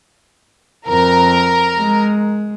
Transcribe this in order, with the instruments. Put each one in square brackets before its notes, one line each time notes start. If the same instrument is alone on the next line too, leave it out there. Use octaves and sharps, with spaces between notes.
[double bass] F2 [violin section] A#4
[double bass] G#3